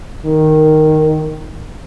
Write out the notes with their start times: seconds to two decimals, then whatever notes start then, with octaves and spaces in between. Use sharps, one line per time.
0.26 D#3